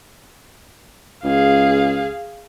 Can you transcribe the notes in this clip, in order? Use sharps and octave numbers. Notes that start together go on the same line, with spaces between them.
C#2 G#4 F5